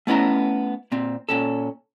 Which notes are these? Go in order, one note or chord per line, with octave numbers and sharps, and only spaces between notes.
A3 B3 C#4 E4 D#5 A#5
A#2 C4
A#2 C#4 A4